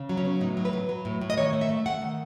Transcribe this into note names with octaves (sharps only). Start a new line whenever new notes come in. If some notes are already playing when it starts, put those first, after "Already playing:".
Already playing: C#3
F#3
C#4
B3
A2 D#4
F#3
B4
F#3
F#3
A2
A2
D#5
D#3 C#5
A3
E5
A3
A3 F#5
D#3